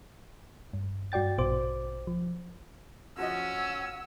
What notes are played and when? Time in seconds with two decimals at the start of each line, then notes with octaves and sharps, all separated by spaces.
0.73 G2
1.12 G2 F#4 D5 G5 A6
1.38 A#1 B2 C5 D6
2.07 F3
3.18 F3 C#4 F#4 D#5 F#5 E6